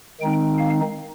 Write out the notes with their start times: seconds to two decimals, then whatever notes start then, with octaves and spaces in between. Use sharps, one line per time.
0.21 D#3 G#3 C4 D#4 G5
0.58 F5